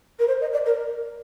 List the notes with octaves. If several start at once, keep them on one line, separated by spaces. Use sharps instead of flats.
A#4
C5
D#5
D5
A#4